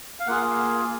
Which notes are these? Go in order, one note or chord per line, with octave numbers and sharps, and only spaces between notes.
F5
A#3 F4 G#4 F#5